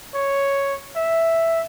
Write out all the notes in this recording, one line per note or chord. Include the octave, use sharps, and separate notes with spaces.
C#5
E5